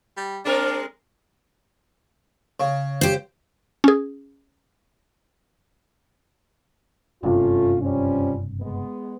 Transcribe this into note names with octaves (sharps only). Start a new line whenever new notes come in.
G3
G#3 C4 D4 A#4
C#3
G4 C5
C#4 G#4
F#1 G2 C3 A3 C#4 F4
F3 G3 C#4
G#3 B3